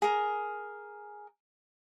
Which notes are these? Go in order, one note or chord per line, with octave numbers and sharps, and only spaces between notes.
G#4 A#4